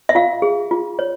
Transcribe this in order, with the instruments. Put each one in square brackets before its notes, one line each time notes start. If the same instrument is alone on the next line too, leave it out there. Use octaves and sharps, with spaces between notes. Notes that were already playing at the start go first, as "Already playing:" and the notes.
[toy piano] E5
F4 F5
G#4
F4
C#5